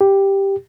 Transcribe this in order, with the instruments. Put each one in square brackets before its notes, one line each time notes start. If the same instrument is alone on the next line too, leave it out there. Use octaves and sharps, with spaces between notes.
[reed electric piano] G4